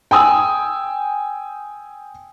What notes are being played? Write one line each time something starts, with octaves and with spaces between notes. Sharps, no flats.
G5 G#5 D#6 E6